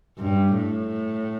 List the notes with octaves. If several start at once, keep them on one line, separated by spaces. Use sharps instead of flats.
G2
A2